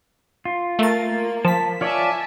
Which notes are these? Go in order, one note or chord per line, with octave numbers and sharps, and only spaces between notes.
F4
A3 A#4 A6
A#3
F3 A5 B6
F4 C#5 D5 E5 G#5 A5